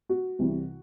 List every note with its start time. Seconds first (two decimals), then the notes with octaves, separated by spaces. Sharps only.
0.09 F#4
0.39 C2 C3 E3